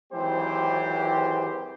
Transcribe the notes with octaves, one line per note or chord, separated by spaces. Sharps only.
G#1 E3 F#3 C4 G4 C5